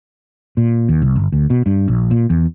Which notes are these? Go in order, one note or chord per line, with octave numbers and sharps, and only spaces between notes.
A#2
D#2
C2
G1
D2
B2
G2
A#1
A#2
E2